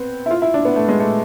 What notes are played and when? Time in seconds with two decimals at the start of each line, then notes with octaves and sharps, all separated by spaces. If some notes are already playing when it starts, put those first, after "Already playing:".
Already playing: B3 C4
0.26 E4
0.31 F4
0.42 E4
0.54 D4
0.65 B3
0.76 A3
0.88 G#3
1.00 A3